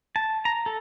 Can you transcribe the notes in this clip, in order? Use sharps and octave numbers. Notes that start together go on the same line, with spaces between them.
A5
A#5
A4